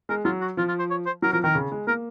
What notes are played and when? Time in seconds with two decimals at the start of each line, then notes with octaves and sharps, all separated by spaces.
0.09 G#3 A#4
0.25 F#3 F4
0.41 F#4
0.57 F3 F4
0.68 F4
0.79 C5
0.90 C#5
1.06 C5
1.22 F#3 A#4
1.33 F3 A#4
1.44 D#3 A#4
1.55 C#3
1.72 G#3
1.87 A#3 A#4